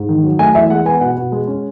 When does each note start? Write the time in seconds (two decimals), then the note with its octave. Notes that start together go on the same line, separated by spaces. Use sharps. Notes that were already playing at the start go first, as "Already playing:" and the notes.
Already playing: G#2
0.09 D#3
0.24 F#3
0.39 A3 G#5
0.54 E2 E5
0.70 G#3 F#5
0.85 B3 G#5
1.01 B2 F#5
1.18 B2
1.32 G#3
1.48 C#4